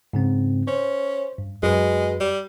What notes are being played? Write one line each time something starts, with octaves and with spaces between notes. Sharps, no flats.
G#2 C#3 C4
C#4 C5
G2
F#2 G#3 F#4 B4
G3